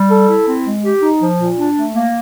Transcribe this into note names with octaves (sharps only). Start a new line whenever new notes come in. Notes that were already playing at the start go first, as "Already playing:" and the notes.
Already playing: G3
A4
E4
C4
G#3
G4
D#4
F3
A#2
D4
A3
A#3